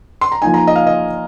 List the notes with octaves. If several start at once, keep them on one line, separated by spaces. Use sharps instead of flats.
C6
A#5
F3 A#3 D#4 G#5
A#5
D#5
F5
D#5